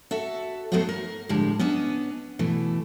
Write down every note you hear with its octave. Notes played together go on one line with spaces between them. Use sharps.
F#4 A4 E5
F#3 A3 B3 D#4 F#4 C5
A#4
A2 D3 F3 G3 G#3
B3 C#4 D4 D#5
B2 E3 A3